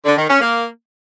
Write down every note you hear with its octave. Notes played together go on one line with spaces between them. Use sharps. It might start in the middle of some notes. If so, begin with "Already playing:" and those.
D3
D#3
C#4
A#3